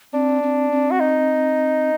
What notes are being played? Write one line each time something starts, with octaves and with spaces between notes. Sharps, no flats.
C4 D4
C4
C4
F#4
D#4